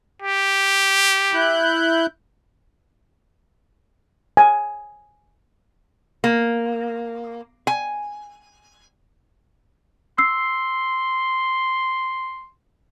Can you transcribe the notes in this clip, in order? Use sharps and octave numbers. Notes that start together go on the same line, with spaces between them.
G4
E4 F#6 G6
G#5
A#3
G#5
C6 E6 C7